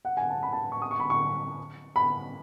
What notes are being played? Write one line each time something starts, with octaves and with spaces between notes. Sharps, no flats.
F#5
G#5
A5
B5
A5
C#6
D#6
C#6
B5
C#6
B5